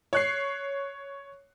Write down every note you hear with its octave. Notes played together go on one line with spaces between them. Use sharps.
C#5 F#6 C7